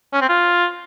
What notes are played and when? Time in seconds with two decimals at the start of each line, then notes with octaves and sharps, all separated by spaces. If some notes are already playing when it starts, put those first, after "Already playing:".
0.13 C#4
0.21 C4
0.29 F4